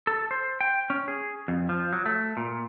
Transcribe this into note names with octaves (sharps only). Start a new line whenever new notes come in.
A4
C5
G5
C#4
G#4
F2
F3
F#3
A3
A#2